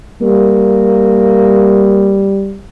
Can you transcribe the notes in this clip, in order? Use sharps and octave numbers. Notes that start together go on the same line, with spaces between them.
G3 A#3